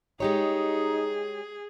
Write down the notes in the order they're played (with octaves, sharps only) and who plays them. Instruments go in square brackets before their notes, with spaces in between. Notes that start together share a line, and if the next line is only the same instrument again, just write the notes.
[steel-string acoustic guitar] G#3 G4 C#5 [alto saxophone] D#4 [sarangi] G#4